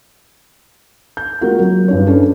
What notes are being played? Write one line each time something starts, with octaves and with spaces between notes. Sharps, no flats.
G6
G#3 A#3 C4 F4 F#4 A#4
F#3
G2 D4 C#5
C#4 D4 A4 B4